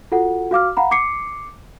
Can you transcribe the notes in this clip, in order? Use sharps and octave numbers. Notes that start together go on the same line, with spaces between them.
F4 F#4 A4 F#5
F#4 F5 D6 F6
F5 F#5 A#5 B5
D6 C7 C#7